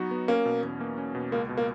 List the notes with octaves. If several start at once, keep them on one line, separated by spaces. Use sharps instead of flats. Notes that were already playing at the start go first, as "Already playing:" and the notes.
Already playing: F#3 B3 D#4 F#4
B3
A#3 C#4
B2
E2
A#3
C#4
B2
C#2 A#3
B2
A#3